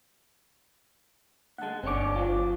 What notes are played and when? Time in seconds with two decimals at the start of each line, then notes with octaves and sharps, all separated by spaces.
1.58 D2 G#3 F#5 A5
1.83 G1 C4 D4 C#5 D6
2.16 F#3 F4